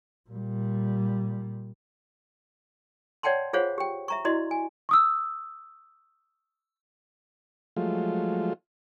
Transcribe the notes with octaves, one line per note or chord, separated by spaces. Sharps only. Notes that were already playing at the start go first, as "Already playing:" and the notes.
A#2 G3
C#5 D5 F#5 G5 A5 C6
F4 G#4 C5 C#5 F5 F#5
G4 G5
E5 A#5 C#6
E4 F#4 D5 D#5 C6
G#5
C#6 D#6 E6
F3 F#3 G#3 A3 F4